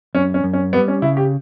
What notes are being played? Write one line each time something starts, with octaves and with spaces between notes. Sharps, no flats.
F#2 C#4
C#4
F#2
C#4
G3 B3
C#4
C#3 E4
G4